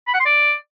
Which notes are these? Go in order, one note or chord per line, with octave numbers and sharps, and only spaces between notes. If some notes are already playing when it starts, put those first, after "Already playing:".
B5
F#5
C6
D5